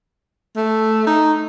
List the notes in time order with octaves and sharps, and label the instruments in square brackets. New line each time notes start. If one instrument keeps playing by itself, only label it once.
[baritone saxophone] A3
D#4